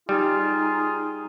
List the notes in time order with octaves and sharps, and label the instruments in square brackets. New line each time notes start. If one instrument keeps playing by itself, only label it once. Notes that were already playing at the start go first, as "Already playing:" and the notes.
[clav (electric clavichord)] G3 [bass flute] D#4 [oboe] F4 [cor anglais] G#4